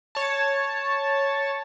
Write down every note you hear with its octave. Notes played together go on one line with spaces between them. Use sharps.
C#5 A5